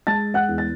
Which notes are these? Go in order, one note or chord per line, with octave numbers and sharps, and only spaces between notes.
G#3 A5 A6
F#5 F#6
E2
A6